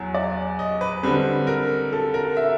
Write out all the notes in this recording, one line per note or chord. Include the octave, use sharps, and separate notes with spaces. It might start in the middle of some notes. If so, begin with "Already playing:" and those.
Already playing: E2 F#3
D5
D#5
B4
D3 G3 C4 B4
A#4
A4
A#4
E5